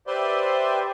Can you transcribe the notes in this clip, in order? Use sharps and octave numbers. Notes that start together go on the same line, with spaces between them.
G4 B4 C5 D5 E5 C6